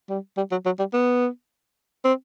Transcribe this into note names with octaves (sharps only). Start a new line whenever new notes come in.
G3
G3
F#3
F#3
G3
B3
C4